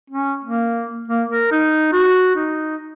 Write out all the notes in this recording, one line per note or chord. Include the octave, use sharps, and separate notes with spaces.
C#4
A#3
A#3
A#4
D#4
F#4
D#4